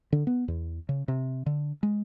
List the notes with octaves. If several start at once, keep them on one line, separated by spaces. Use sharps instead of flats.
D3
B3
E2
C#3
C3
D3
G#3